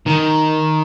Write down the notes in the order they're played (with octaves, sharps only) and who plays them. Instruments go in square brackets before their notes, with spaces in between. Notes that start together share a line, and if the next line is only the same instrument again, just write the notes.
[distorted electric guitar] D#3